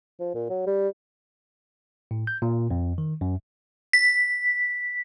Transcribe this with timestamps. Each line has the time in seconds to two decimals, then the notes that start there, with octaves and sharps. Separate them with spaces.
0.20 F3
0.35 A#2
0.50 F#3
0.67 G3
2.11 A2
2.27 G6
2.42 A#2
2.71 F2
2.98 D#3
3.21 F#2
3.93 B6